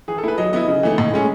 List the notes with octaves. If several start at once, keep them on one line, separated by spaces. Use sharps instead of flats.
E3 G#4
A4
A3 E4 B4
F#3 D#5
B3 E4 D#5
C#3
E3 A3 D#4
A2
G#3 C#4